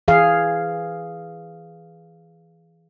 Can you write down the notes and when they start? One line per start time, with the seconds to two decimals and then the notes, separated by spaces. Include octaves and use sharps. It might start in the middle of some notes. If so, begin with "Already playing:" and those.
0.08 E3 G#4 F5